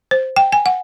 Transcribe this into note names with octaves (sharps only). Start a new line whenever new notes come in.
C5
G5
G#5
F#5